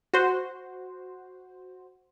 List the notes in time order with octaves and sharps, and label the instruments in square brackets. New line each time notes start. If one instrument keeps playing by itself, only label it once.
[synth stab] F#4 C5